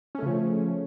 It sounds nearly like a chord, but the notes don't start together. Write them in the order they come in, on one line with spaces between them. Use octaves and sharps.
C#4 A3 C#3 F3